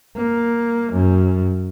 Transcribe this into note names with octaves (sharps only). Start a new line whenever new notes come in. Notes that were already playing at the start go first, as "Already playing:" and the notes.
A#3
F#2